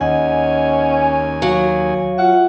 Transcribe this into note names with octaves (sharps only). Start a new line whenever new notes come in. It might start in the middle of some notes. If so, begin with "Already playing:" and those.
D#2 C#4 D#5 F#5 G#5
F#3 F5
F4 E5 F#5